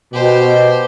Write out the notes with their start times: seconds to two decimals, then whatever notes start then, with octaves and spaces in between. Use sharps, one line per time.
0.13 B2 G4 C5